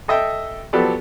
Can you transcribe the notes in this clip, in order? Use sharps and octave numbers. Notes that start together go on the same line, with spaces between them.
A4 D#5 E5 G5
F3 F#3 B3 G4 A4 D5